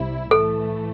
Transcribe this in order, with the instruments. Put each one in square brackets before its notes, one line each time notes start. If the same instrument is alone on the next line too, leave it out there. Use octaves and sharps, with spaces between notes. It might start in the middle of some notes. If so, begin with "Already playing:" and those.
Already playing: [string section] C2 C3 G3 E4
[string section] A2 E3 A3 [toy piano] A4